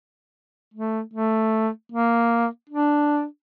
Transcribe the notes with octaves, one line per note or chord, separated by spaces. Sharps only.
A3
A3
A#3
D4